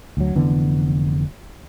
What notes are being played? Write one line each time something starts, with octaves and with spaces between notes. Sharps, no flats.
D2 F#3
F1 D3 E3 B3